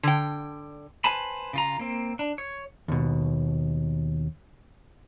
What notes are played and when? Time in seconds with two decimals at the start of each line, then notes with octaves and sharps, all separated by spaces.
0.03 D3 G5
1.04 B4 C5 G#5 A5 B5
1.53 C#3 F4 A#5
1.79 A#3 C4
2.19 D4
2.38 C#5
2.88 D#2 B2